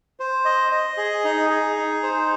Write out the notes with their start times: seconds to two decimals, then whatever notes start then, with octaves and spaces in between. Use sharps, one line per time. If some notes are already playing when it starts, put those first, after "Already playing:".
0.20 C5
0.45 D#5
0.72 D#5
0.97 G#4
1.24 D#4
1.50 G#4
1.76 D#4
2.03 C5